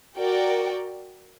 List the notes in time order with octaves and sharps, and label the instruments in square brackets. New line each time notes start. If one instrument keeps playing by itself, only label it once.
[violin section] F#4 A#4 D5 G5